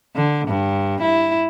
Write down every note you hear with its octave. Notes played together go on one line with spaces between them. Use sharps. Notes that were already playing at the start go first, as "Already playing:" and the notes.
D3
G2
E4